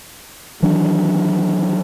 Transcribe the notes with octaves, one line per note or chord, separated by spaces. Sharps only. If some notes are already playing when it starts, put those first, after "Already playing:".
D#3 E3 F#3 D4